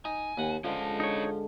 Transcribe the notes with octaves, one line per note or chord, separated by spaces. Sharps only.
D#4 G#5
D#2 F#5
D3 F3 G#3 C#4 D#5
D#4 C#5